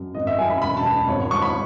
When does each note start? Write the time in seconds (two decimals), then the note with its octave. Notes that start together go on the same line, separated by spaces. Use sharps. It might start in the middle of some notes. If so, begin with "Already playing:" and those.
Already playing: F#2
0.15 G#1 D#5
0.27 E5
0.39 F#2 G#5
0.50 B5
0.61 E1 B5
0.77 A5
0.85 E1
1.08 G#1 C#5
1.31 G#2 C#6
1.42 B5